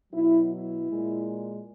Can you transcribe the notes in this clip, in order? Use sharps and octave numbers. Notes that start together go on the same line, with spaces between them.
B2 F#3 E4
E4
A#2 G#3